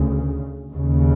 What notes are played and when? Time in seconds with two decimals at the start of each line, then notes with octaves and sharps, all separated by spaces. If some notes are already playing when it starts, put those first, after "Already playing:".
Already playing: D2 C#3
0.73 D#2 C#3